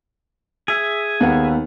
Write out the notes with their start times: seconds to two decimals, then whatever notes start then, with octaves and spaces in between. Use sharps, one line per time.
0.68 G#4 E5
1.20 D#2 B3 F#5